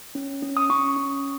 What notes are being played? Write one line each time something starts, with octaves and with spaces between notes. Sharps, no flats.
C#4
C#4
D#6
C#4 C#6
C#4